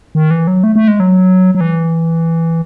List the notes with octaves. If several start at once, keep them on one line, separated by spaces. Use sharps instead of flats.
D#3
E3
F#3
A3
A3
G#3
F#3
F#3
E3